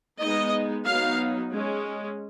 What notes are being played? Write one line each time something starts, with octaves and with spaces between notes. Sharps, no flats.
G#3 B3 D#4 D#5
F#3 B3 D#4 F5
G#3 C#4